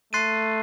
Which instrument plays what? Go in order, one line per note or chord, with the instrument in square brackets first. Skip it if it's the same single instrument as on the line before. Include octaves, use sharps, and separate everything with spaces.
[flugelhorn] A3 [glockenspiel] C6 F#6 A6 C7 D#7